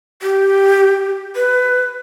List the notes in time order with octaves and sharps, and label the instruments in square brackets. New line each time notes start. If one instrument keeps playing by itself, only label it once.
[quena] G4
B4